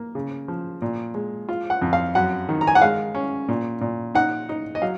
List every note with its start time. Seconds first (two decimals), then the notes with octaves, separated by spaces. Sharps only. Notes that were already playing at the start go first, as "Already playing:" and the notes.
Already playing: A#3
0.15 C#3
0.48 F3
0.82 A#2
1.14 G#3
1.49 F4
1.70 F#5
1.82 F2
1.93 F5
2.15 F#2 F#5
2.49 D#3
2.61 A#5
2.67 G#5
2.75 F#5
2.82 G#3 F5
3.15 C#4
3.49 A#2
3.81 A#2
4.15 D#4 F#5
4.49 D#4
4.75 D#5
4.82 F#3 F5